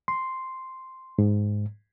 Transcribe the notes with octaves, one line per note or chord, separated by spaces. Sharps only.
C6
G#2